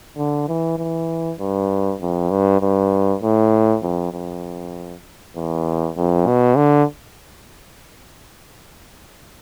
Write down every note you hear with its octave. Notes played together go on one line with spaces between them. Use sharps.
D3
E3
E3
G2
F2
G2
G2
A2
F2
F2
E2
F2
B2
D3